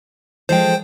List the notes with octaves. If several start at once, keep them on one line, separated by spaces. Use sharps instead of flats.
F3 G#3 A4 C5 G5